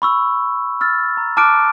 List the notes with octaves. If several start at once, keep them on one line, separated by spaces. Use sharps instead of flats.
B5 C#6 E6
E6 F6 A6
A#5
A5 D6 F6 F#6 D7